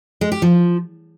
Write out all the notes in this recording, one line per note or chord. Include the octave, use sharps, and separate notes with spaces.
G#3
G4
F3